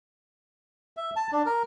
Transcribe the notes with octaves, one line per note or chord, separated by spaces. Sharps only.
E5
A5
D4
A#4